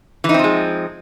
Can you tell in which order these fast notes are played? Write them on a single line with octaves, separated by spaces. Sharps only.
E3 D#4 C4 F3 G#3